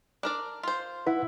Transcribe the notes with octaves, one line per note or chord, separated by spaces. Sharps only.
D4 A#4 D5
F4 C5
E4 B4 E5 F#5